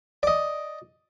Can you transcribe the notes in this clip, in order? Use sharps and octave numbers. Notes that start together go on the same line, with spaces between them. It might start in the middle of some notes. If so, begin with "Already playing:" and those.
D5 D#5